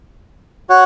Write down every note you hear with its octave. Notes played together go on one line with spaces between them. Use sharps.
F#4 C#5 F#5